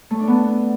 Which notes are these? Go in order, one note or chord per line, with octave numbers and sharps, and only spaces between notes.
A3
D4
B3